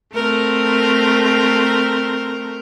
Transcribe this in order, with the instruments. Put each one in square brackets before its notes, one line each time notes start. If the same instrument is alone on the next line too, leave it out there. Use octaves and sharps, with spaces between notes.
[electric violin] A3 C4 [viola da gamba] A#4